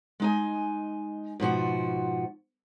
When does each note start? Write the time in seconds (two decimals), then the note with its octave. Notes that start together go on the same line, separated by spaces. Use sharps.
0.20 G#3 D#4 G#5
1.40 G#2 B2 F3 F#4